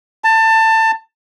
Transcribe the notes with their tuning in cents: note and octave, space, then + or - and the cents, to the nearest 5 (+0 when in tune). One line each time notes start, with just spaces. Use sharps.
A5 +20